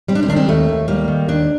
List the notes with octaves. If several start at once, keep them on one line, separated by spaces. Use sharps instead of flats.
G3 C4
D4
C4
D#3 D4
C4
D#2 A3
D#2
G3 A#3
D#3
D#2 D4